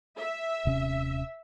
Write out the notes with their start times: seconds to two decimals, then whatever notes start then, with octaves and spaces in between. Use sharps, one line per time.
0.17 E5
0.65 D#1 C3 C#4